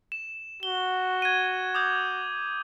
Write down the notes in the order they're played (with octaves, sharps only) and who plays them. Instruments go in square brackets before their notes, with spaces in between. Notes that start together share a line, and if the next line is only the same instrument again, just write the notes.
[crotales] E7
[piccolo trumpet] F#4 [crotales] G7
[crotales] G#6 D#7
D6 D#6 G6